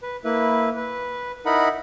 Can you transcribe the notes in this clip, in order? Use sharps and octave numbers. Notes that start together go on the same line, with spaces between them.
B4
A#3 E4 B4
B4
D#4 E4 A#4 F#5 B5